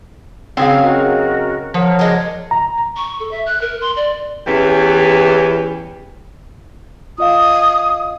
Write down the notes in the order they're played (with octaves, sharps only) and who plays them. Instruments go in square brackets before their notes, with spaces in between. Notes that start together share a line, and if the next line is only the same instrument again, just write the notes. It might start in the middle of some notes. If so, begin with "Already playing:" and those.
[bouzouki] C#3 F#3 C#4 [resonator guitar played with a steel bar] C4 G#4 F5
[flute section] F#4 A#4 D#5
[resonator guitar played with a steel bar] F3 [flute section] A#4 C#5 F#5
[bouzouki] F#3 G#3 D4
[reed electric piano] A#5
[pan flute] C#6
A4
E5
F#6
A#4
C6
D5
[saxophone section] E2 E3 C#4 G4
[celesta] F4 D#5 F5 [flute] D#6